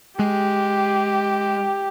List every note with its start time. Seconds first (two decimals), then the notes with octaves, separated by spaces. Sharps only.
0.19 G#3 G4